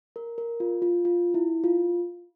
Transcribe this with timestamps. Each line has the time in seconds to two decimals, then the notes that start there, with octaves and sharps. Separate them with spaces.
0.16 A#4
0.38 A#4
0.60 F4
0.82 F4
1.05 F4
1.34 E4
1.64 F4